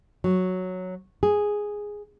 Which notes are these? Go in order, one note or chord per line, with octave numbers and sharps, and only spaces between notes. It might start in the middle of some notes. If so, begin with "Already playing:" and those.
F#3
G#4